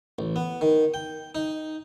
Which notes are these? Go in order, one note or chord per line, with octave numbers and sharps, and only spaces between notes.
A1
B3
D#3
G5
D#4